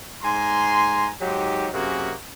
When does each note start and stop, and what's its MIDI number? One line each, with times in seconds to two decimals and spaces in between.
0.23 1.09 44
0.23 1.09 80
0.23 1.09 82
0.23 1.09 84
1.21 1.68 44
1.21 1.68 54
1.21 1.68 63
1.21 1.68 67
1.73 2.14 42
1.73 2.14 48
1.73 2.14 58
1.73 2.14 61
1.73 2.14 66
1.73 2.14 68